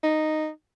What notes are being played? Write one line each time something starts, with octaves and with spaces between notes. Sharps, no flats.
D#4